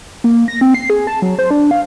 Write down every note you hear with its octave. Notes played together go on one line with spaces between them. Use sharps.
A#3
A#6
C4
C7
G#4
A5
F#3
C5
D4
F5